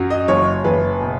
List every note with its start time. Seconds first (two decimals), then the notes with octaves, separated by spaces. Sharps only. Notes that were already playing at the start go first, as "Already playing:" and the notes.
Already playing: F#2 F#3
0.10 D#5
0.28 F#1 C#5
0.64 F#1 B4
1.01 B2